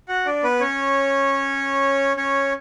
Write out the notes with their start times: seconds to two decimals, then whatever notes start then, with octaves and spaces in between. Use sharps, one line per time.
0.08 F#4 F#5
0.26 D4 D5
0.43 B3 B4
0.61 C#4 C#5
2.16 C#4 C#5